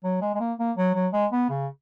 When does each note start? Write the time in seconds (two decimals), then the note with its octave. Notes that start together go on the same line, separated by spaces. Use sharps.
0.04 F#3
0.22 G#3
0.34 G#3
0.40 A#3
0.59 A#3
0.77 F#3
0.95 F#3
1.13 G#3
1.32 B3
1.49 C#3